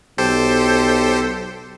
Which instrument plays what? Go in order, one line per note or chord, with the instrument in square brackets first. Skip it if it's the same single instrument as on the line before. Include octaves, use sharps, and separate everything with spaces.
[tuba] B1 [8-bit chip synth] G4 A4 C5